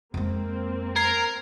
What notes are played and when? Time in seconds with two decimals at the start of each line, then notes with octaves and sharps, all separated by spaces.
0.14 F2 G#3 A#3 C4
0.96 A#4 G#6 C7